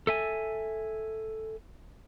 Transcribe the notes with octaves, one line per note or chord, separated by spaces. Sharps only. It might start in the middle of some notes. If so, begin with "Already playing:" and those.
A4 E5 G#5